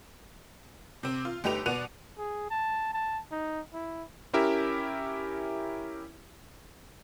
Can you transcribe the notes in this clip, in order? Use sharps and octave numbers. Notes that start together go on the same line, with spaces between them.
C3 C4
F4
G1 A3 D#4 G4 B4 F7
B2 B3 D5 F#5 D#7 F7
G#4
A5
A5
D#4
E4
C#4 E4 G4 A#4 E5